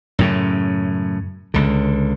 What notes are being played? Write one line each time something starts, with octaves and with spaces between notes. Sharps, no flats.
F#2 A2 C#3
C#2 D3